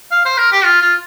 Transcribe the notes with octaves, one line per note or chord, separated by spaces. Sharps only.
F5
C5
A#4
G4
F4
F4